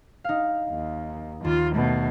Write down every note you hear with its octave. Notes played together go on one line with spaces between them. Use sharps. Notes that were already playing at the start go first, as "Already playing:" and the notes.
D#4 F5
D#2
D#2 F4
B2 A3